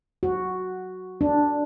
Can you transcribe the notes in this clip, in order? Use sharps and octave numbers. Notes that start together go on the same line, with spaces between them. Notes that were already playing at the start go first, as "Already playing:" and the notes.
F#4
D4